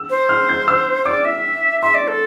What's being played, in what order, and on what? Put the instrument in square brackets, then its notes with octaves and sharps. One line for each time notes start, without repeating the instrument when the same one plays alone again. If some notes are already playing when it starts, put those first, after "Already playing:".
Already playing: [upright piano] E6
[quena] C5
[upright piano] F6
G6
E6
[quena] D5 [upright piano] D6
[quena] E5
[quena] E5 [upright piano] C6
[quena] D5
A4